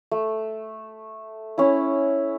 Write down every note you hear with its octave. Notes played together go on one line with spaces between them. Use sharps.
A3
C#4 E4